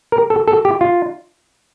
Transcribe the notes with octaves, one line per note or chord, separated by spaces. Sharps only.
A#4
A4
A4
G4
F4